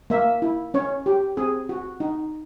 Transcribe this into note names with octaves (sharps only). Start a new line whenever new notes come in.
A#3 E5
E4
C#4 C#5
G4
C4 G#4
F#4
D#4